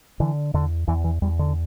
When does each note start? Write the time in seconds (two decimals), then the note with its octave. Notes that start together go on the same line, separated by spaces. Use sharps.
0.20 D3 E3
0.54 E2 D3
0.88 E2 E3
1.04 E3
1.22 E2 G3
1.39 D3